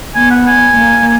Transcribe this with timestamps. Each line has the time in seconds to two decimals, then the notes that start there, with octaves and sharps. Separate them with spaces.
0.15 B3 G#5
0.30 F#5
0.47 G#5
0.77 A#3